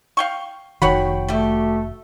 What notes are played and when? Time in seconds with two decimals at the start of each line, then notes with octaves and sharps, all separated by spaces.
0.17 F5 G5 C#6
0.82 F1 D#3 F#4 C#5 F#5 G5 B5
1.28 G3 A3 G4